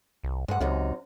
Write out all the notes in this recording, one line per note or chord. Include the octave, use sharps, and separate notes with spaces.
C2
G2 G#3 F#5
C#2 F#2 C3 D#4